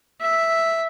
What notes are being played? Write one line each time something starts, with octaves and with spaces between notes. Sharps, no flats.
E5